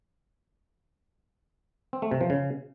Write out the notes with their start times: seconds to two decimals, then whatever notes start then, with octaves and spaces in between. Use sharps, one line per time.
1.93 C4
2.02 A3
2.11 C3
2.21 F3
2.30 C#3